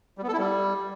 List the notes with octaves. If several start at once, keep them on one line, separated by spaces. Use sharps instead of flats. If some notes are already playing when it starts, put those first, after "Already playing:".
G3
B3
A4
E4
G3